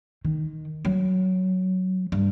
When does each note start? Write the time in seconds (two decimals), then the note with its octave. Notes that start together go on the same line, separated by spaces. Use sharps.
0.25 D#3
0.85 F#3
2.12 G2